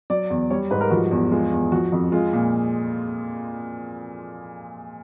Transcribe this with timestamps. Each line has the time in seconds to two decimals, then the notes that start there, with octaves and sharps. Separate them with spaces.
0.10 F#3 D5
0.30 E2
0.50 G3 C#5
0.71 G#2 B4
0.81 A#4
0.90 F3 F#4
1.11 E2
1.31 G#3 F4
1.52 E2
1.72 F3 F#4
1.92 F2
2.12 G#3 F4
2.33 A#2